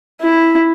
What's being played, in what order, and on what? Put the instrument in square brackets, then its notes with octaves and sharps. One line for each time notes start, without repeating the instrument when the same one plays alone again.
[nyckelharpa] E4